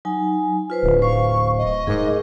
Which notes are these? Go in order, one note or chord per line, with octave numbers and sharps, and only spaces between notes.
F#3 D#4 G#5
F4 B4 C5
D1
C5 F5 C#6
D#5
G#2 G#4 A#4 D6